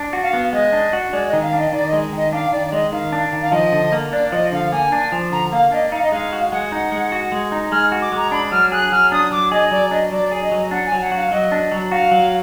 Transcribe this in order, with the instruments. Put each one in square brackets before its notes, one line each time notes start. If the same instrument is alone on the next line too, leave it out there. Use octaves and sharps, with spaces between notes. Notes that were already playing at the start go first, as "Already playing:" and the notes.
Already playing: [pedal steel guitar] D4
F#4
[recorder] F5
[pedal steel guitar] B3
[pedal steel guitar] G#3 [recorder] D#5
[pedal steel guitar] D4
F#4
[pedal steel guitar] G#3 [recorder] D5
[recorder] D#5
[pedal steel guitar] D#3
[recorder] F5
[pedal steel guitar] D4 [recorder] D#5
[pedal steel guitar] D#3 [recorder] D5
[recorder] D#5
[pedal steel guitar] G#3
[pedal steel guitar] D#3 [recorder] D#5
[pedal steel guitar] D4 [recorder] F5
[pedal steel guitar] D#3 [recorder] D5
[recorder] D5
[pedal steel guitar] G#3 [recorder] D#5
[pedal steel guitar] D#3 [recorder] F5
[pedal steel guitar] D4
D#3
[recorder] F5
[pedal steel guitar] F3 [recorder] D#5
[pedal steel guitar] D3
A#3
[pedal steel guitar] D4 [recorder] D5
[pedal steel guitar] F3 [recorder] D#5
[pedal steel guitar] D3 [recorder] F5
[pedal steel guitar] A#3 [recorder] G#5
[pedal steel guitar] D4
F3
[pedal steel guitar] D3 [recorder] A#5
[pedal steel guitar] A#3 [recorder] F5
[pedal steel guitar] D4 [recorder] D#5
[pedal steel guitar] D#4 [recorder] F5
[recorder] D#5
[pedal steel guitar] G#3 [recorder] F5
[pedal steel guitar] F#4
[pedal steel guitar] G#3 [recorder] F#5
[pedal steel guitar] D#4
G#3
F#4
G#3
D#4
[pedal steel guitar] G#3 [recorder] F6
[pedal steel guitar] F#4
[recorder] D6
[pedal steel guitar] G#3
[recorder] A#5
[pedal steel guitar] D4 [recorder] B5
[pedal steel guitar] F#3 [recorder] F6
[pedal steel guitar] G#4 [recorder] F#6
[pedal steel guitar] F#3 [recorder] F6
[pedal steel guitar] D4 [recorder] D#6
[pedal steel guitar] F#3 [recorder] D6
[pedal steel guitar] G#4 [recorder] D#5
[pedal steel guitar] F#3 [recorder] D5
[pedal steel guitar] D4 [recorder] D#5
[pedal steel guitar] F#3 [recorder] D5
[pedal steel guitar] G#4
[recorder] D#5
[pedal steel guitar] F#3
[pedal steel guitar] D4 [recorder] F#5
[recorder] G#5
[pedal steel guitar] F#3
[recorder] F#5
[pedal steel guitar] F#4 [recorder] F5
[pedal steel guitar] F#3 [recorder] D#5
[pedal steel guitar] D4
F#3
[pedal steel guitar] F#4 [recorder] F5
[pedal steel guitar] F#3